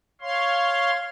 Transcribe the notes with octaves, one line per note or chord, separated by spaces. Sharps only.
C#5 F5 C6